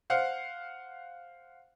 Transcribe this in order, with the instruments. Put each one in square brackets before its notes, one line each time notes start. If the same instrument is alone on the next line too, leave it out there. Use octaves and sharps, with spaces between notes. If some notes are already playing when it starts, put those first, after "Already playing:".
[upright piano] C5 F5 F#5